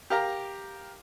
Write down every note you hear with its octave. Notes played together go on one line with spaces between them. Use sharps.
G4 A#4 F5 A#5